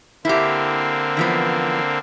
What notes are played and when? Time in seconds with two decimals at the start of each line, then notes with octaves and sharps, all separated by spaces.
0.25 D3 A#3 C4 E4 G4
1.17 E3 F3 B3